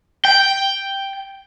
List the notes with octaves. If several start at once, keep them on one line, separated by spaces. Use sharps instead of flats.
G5